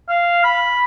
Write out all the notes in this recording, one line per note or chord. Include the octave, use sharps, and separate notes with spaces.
F5
B5